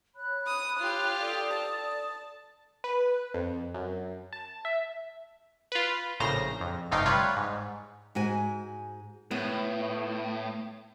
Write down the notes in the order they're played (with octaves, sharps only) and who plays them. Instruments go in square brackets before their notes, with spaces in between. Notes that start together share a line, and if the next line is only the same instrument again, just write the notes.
[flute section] C#5 B5 F#6
[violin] D#6
F4 G4
[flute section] A4 D5 D#6
[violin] A5
[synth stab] B4
F2
F#2
A5
E5
F4 B4
A#1 A2 C#3 C5 A#5 A#6
F2
G1 C3 A3 D#4 F5 G5
G3 F4 B4 C#5
G#2
[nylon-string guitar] G#2 F#4 G#5
[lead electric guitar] A2 [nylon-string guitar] B3